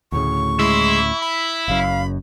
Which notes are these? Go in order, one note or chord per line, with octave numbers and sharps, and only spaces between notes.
D2 A2 C#3 C#6
G#3 E4 C6 E6
B5
F#1 F#2 F5